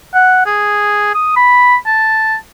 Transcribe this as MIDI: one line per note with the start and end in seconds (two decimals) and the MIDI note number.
0.14 0.42 78
0.46 1.13 68
1.14 1.33 87
1.36 1.76 83
1.86 2.35 81